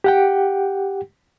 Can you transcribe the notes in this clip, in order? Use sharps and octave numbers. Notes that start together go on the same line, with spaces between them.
G4 F#5 G5